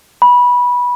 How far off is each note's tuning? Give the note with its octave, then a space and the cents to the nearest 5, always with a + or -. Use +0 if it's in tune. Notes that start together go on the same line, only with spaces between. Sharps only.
B5 -15